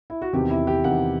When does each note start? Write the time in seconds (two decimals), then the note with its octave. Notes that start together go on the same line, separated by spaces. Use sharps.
0.10 E4
0.22 F#4
0.33 E2 C3 D#3 G4
0.50 E4
0.67 G4
0.84 E2 C3 D#3 F#5